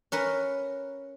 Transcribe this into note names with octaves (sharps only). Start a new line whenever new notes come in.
C#4 A#4 B4